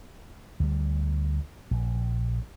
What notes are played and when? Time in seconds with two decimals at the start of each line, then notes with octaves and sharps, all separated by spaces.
0.60 D2 G3
1.71 A#1